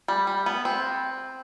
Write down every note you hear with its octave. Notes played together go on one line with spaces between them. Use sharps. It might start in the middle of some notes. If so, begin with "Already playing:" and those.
G3
G3
B3
C4